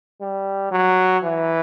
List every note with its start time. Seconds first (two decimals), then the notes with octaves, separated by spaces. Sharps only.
0.21 G3
0.72 F#3
1.24 E3